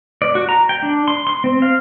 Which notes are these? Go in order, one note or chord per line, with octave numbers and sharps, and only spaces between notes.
D5
F#4
A#5
G5
D4
C6
C6
C4
F5